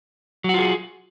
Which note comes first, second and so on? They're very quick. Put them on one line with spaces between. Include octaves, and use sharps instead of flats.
F#3 F#4 F4 G#4